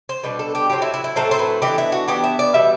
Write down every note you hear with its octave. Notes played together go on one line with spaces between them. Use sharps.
C5
B2 G3 D4 B4
A4
G4
A2 F#3 A3 C4 G4
E4
E4
E4
A2 F#3 A3 C4 A4
C5
B4
E3 B3 D4 G4
E4
F#4
E3 B3 D4 G4
E5
D5
B2 G3 B3 E5